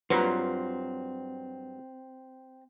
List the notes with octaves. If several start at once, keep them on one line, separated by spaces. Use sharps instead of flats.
G2 F#3 C4 F4 B4 A#5